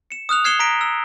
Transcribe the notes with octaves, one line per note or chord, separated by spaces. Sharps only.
C#7 E7
D#6 F6 F#6 F7
F6 G#6 C7 C#7 E7 G7
A#5 A#6 B6 D7
E6